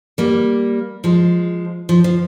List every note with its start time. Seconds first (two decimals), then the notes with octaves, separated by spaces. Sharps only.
0.18 G3 A#3
1.04 F3 G#3
1.89 F3
2.04 F3